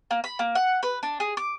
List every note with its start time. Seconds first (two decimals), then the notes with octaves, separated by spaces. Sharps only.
0.11 A#3
0.24 B5
0.39 A#3
0.55 F#5
0.83 B4
1.03 D4
1.20 G#4
1.37 D6